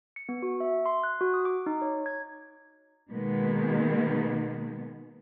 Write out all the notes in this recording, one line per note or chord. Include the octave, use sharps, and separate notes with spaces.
C#7
B3
F#4
E5
C6
F#6
F#4
D#6
D6
D#4
C#5
G#6
B2 D#3 G#3 A#3 B3